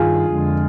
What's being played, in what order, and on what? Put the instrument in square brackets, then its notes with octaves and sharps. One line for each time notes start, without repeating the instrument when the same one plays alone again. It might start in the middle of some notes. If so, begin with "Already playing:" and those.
Already playing: [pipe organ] G2 D#3 [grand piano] F4 G#4
[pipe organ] F2 D3 G#3